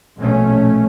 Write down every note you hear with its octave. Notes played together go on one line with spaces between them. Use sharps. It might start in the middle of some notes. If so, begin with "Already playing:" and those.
A#1 B2 A3 C#4